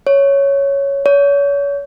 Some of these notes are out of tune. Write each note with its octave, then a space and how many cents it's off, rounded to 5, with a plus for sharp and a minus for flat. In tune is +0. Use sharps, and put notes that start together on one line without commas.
C#5 +0
C#5 +35